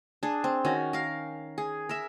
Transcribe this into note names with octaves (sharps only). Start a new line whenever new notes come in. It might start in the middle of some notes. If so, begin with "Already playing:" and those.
D4 G#4
C4
D#3 C#4 F#4
A#4 F5
G#4
A#4 E5